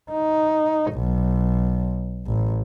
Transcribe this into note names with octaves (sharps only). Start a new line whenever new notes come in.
D#4
B1
A1